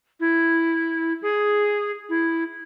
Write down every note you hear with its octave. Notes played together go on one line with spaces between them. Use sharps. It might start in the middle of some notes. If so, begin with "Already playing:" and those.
E4
G#4
E4